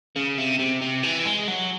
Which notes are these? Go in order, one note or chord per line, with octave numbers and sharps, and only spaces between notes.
C#3
C3
C3
C3
E3
G#3
F#3